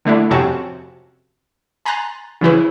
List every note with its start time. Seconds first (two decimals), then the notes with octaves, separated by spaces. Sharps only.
0.05 D3 A3 D4 E4
0.30 F2 C3 C4 C#4 F#4 A5
1.85 G#5 A#5 C6 F#6 A6
2.41 C#3 E3 E4 B4